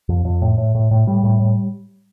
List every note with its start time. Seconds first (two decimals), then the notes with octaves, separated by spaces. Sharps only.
0.09 F2
0.25 F2
0.42 A2
0.58 A2
0.75 A2
0.91 A2
1.07 A2 G3
1.23 A2
1.40 A2